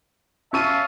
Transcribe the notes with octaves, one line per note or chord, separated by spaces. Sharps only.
C#4 E5 F5 A5 C#6 D#7